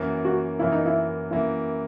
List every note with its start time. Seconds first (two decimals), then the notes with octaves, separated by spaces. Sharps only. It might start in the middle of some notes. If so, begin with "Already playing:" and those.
Already playing: F#2 E3 A#3
0.25 F#4
0.59 F#2 E3 A#3 E4
0.72 D#4
0.85 E4
1.31 F#2 E3 A#3 E4